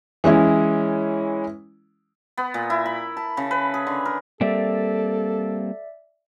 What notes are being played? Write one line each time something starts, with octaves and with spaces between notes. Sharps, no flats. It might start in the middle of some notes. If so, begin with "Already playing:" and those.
E3 G#3 C#4 E4
B3
A#2
E4
B5
A5
C#3
B4
G#4
D3
A#4
G3 A#3 C4 A4 D5 E5